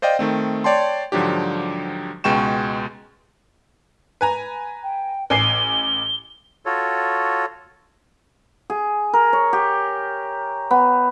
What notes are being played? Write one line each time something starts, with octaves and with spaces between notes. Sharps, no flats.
C5 D5 D#5 F5 G5
D#3 A3 C4
C#5 D5 G5 A5 C6
G#2 D3 F3 F#3 D4 G4
C#2 B2 G#3 G5 C#6 E7
B4 G#5 A#5
G5
A1 G#5 C7 G7
F4 F#4 A4 C#5
G#4
A#4
C#5
G4
B3